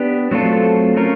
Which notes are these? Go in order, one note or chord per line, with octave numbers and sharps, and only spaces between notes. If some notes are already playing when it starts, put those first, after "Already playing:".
Already playing: B3 D4 G4
F#3 A3 C4 F4 A4
A3 C#4 F4 A#4